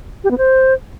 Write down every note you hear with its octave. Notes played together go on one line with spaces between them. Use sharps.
G4
B3
C5